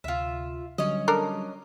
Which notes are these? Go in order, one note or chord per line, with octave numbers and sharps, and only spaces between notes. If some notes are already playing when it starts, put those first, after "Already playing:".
D2 C3 F4 E5
D3 F#3 G3 C#4 D#5
D4 A4 A#4